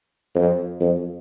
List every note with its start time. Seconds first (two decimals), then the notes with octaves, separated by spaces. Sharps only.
0.35 F2
0.80 F2